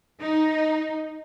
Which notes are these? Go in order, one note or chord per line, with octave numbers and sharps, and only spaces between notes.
D#4